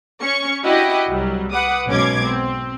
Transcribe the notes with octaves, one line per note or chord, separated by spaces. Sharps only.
C#4 C#6 C#7
D4 E4 F#4 G4 D#5
C2 F#3 G3
B4 F#5 D6 D#6
B1 G#2 B2 C#4 D6 G#6
C4